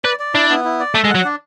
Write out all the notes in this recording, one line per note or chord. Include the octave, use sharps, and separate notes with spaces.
B4 D5
D5
D4 E4
B3
E4
D5
A3 A4
G#3
F#3 F#5
D4